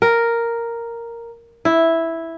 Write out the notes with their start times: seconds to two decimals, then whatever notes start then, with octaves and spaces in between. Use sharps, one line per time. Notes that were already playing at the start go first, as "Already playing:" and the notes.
0.02 A#4
1.65 E4